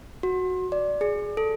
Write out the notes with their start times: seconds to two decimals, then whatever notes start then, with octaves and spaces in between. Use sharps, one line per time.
0.23 F#4
0.72 D5
1.01 G#4
1.37 A4